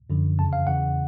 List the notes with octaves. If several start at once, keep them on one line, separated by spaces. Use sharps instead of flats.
F#2 D3 F3
F2 C#3 E3 A5
F5
E2 C#3 E3 F#5